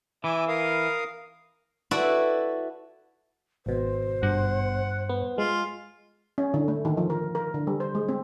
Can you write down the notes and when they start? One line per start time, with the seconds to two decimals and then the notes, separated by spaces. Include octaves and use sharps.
0.24 E3 E5 G#5 D6
0.48 A#4 F5 D#6
1.91 E4 F#4 A4 B4 D5
3.66 G#1 B2 C5
4.23 G2 F#5
5.09 B3
5.38 G#3 F4
6.38 C#4
6.54 D3
6.68 A3
6.85 D#3
6.97 F3
7.10 A#4
7.35 A#4
7.54 D3
7.67 G3
7.80 C5
7.95 G#3
8.09 C4